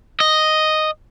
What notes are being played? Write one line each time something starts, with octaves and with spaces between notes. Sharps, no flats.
D#5